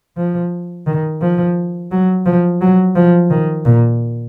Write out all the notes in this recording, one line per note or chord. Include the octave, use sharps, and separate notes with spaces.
F3
D#3
F3
F#3
F3
F#3
F3
D#3
A#2